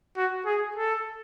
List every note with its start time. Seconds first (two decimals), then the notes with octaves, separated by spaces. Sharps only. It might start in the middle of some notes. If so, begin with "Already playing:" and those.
0.16 F#4
0.46 G#4
0.76 A4